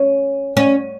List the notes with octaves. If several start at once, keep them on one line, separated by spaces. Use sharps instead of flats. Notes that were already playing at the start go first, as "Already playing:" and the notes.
Already playing: C#4
C#4